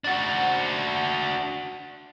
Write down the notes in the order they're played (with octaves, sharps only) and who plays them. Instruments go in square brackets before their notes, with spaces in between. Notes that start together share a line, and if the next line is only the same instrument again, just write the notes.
[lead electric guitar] D4 F#4